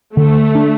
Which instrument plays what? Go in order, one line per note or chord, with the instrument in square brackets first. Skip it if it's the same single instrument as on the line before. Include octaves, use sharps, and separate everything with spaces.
[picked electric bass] D3 [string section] A3
[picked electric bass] D4